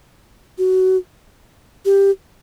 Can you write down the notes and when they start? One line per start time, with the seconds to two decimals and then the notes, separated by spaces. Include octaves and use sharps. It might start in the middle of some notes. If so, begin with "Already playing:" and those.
0.58 F#4
1.85 G4